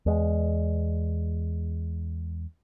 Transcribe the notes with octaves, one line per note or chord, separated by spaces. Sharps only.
E2 G#3